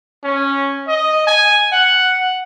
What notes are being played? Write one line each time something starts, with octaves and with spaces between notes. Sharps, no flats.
C#4
D#5
G#5
F#5